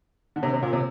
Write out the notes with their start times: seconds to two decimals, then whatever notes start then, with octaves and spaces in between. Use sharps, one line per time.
0.36 D3
0.43 C3
0.54 C3
0.63 A#2
0.73 C3